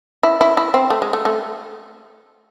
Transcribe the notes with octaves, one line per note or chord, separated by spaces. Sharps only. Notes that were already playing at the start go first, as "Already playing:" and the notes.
E4
E4
E4
C4
A3
G#3
A3
A3